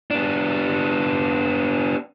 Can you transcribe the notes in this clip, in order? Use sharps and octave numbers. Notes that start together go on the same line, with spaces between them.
B3 D4